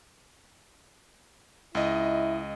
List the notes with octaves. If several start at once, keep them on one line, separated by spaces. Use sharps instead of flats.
C#2 E4 D#5